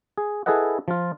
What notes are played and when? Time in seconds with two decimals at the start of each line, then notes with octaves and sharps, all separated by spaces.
0.17 G#4
0.46 E4 G#4 A4 B4 D#5 F#5
0.88 F3 F4